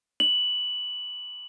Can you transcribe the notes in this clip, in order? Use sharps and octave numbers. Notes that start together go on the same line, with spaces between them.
F#7